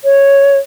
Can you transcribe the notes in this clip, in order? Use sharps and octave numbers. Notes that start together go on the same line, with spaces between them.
C#5